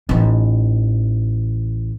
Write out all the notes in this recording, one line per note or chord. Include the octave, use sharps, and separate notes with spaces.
A1 D#4